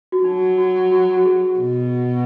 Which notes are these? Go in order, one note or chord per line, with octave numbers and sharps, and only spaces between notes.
F#4
F#3 D#4
F#4
F#4
F#4
G#4
B2